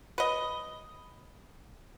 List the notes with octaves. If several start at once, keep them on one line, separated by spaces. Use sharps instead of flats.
B4 D#5